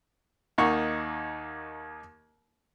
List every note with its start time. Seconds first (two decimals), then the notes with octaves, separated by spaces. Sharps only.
0.58 D#2 A#3 D#4 F#5 C#6